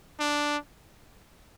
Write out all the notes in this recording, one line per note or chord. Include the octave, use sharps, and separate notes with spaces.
D4